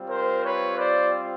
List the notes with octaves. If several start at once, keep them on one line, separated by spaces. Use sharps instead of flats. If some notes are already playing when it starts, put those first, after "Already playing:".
Already playing: G3 C4 F4
A#4 C5
B4 C#5
C5 D5